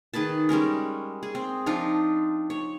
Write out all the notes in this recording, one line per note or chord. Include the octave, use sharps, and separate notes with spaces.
D#3 G#4 B4 A5
G3 G#3 C#4 A#4
G#4
C4
F3 D4 D#4 F4
C#5